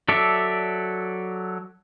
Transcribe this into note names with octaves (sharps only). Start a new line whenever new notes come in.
F#3 A4 D5 E5